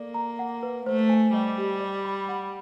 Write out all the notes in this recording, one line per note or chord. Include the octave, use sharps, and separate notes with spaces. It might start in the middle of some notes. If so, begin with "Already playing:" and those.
Already playing: A#3 A4 D5
A#5
F#5
B4
A3 C5
G#5
G3 D#5
G4
D5
B5
F#5